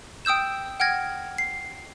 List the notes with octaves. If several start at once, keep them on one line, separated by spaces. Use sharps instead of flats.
G5 D#6 E6 G6 E7
F#5 G5 F6 G#6 A#6
C7